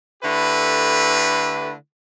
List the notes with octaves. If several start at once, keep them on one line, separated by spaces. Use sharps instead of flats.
D3 A3 E4 G4 B4